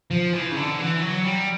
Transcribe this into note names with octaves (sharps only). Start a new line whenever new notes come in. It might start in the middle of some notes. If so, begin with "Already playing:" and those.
F3
E3
C#3
D3
E3
F#3
G3